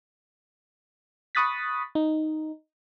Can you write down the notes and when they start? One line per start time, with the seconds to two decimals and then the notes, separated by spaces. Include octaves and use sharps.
1.35 B5 C#6 D#6 F#6 A6 B6
1.95 D#4